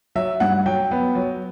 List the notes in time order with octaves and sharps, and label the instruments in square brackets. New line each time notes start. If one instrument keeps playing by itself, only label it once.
[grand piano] F#3 E5
G2 F#5
F#3 G5
B3
F#3